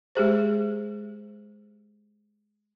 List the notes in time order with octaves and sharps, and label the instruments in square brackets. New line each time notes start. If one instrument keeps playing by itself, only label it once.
[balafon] G#3 G4 G#4 C5